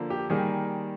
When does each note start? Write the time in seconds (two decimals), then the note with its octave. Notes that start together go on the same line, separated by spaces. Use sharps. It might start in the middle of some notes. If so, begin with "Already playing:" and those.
Already playing: D3 F3 A#3
0.10 G4
0.30 D#3 G3 A#3 G#4